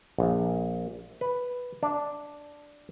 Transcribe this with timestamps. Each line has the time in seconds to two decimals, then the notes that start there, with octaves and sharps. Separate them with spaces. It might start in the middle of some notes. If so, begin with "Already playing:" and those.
0.18 A#1
1.21 B4
1.83 D4